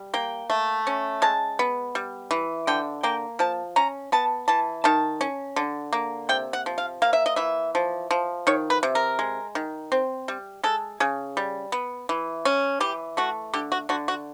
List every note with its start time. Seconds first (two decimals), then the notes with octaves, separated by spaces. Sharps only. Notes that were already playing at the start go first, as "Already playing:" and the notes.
Already playing: G3
0.14 A#3 G5
0.50 A3
0.87 C#4
1.22 G#3 A5
1.59 B3
1.95 G3
2.31 E3
2.67 D3 G5
3.03 A#3 G5
3.39 F3 A5
3.76 C#4 A#5
4.12 B3 A5
4.48 E3 A5
4.84 D#3 A5
5.21 C#4
5.56 D3
5.93 A#3
6.29 C3 G5
6.53 F#5
6.66 F3
6.78 F5
7.02 A#3 F5
7.13 E5
7.26 D#5
7.36 E3 E5
7.75 F3
8.11 F3
8.47 D#3 C#5
8.70 B4
8.83 C3
8.95 A#4
9.19 G#3
9.55 D#3
9.92 C4
10.28 G3
10.63 G#3 A4
11.00 C#3 G#4
11.37 G3
11.72 B3
12.09 E3
12.45 C#4
12.80 E3 G4
13.17 A3 F#4
13.54 D3 G4
13.72 F#4
13.89 D3 F#4
14.08 F#4